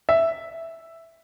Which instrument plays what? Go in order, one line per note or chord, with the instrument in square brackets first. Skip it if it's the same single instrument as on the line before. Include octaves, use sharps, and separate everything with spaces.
[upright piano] E5